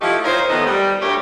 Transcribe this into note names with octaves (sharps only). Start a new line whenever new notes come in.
F3 A3 D#4 E4 G4
D#4 F4 A#4 C5 C#5
D#3 F3 A3 B3 D#4
G3
D2 A3 G4 A#4 C#5